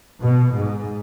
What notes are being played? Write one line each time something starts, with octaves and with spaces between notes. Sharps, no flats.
B2
G#2